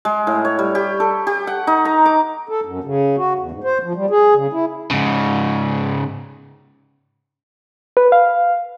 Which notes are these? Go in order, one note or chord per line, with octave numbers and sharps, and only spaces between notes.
G#3
A2
C#5
G3
G4
A4
G4
F#5
D#4
A#5
D6
A4
F#2
C#3
F#4
E2
G#2
C5
F3
G3
G#4
C#3
E4
G#2 C#3
B4
F5